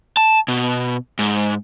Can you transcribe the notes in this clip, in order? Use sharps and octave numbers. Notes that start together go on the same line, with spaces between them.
A5
B2
G#2